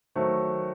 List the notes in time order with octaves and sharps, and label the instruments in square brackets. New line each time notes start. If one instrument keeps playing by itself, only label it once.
[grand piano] D#3 F#3 A3 [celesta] C5